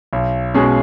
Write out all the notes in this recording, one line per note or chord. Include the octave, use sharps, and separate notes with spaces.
B1
B2 G#3 C#4 G#4